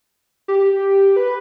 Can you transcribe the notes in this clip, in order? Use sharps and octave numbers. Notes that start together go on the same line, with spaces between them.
G4
B4